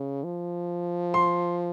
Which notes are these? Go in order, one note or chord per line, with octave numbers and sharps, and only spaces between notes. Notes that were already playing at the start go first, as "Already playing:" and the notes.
Already playing: C#3
F3
C6